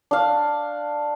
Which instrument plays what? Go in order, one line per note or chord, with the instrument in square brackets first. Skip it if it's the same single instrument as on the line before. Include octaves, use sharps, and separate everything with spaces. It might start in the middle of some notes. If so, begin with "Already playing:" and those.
[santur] D4 F5